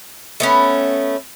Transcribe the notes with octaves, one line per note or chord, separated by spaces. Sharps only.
A3 B3 C#4